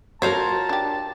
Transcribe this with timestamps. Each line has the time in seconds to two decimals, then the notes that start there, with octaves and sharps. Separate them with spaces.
0.22 F4 F#4 A#4 C5 C#5 A5
0.69 D4 G4